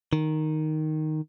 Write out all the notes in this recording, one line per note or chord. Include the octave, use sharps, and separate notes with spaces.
D#3